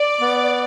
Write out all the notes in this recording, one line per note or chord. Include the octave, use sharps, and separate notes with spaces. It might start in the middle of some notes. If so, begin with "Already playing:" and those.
Already playing: D5
B3